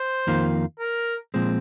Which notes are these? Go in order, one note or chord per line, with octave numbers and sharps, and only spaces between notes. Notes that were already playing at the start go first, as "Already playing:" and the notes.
Already playing: C5
F2 D#3 A#3 F4
A#4
A#2 F3 G#3 C4